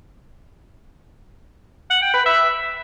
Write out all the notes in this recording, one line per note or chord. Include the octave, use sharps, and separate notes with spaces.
F#5
G5
B4
E5